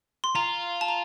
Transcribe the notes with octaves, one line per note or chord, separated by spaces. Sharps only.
C6
F4 A#5
A5
A#5